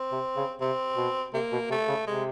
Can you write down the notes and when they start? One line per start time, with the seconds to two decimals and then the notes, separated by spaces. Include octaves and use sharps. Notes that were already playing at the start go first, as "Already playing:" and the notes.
Already playing: C4
0.12 C3
0.36 C#3
0.60 C3 C4
0.97 B2
1.33 C3 A#3
1.52 B2
1.70 C3 A3
1.88 C#3
2.07 C3 G#3